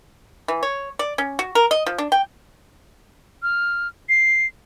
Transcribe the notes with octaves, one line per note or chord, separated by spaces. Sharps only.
E3
C#5
D5
C#4
F#4
A#4
D#5
F3
D4
G5
F6
C7